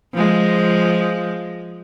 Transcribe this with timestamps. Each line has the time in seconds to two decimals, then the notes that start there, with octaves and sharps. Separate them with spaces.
0.14 F3 G#3